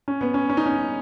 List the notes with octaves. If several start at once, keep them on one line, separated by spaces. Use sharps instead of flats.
C#4
B3
C#4
C#4
D#4
C#4